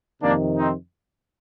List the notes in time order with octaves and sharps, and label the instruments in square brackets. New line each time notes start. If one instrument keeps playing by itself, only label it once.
[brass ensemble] F2 C3 D#3 A#3 D4
C4 D#4